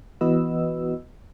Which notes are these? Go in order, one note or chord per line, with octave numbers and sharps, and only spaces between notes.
E3 B3 F#4 B4 D#5 E6